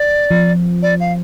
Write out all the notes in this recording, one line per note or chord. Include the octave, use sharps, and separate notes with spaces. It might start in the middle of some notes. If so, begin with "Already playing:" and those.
Already playing: D5
F3
D5
F5